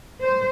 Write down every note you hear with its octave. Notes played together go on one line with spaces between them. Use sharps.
C5